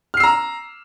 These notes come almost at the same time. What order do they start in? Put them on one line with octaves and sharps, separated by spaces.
F6 C7 E6 A#5